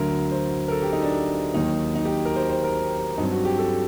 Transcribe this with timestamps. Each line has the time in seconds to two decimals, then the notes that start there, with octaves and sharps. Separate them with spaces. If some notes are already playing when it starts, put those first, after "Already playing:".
Already playing: D2 D3 F#3 A#4
0.32 C5
0.68 A#4
0.72 A4
0.82 G4
0.93 D#4
1.02 D4
1.54 D#2 D#3 F#3 A#3 D#4
1.95 D#4
2.05 G4
2.25 A#4
2.36 C5
2.49 C5
2.64 A#4
3.18 G2 F#3 C4 D#4
3.32 F#4
3.45 G4
3.59 A4